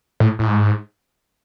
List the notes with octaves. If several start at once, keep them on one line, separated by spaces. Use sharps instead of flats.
A2
A2
G#2